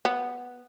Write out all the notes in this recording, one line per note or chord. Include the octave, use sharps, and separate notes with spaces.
B3